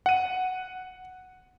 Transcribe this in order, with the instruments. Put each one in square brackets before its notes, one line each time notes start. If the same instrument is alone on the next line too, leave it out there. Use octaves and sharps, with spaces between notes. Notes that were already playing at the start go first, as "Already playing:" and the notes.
[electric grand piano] F#5 D#7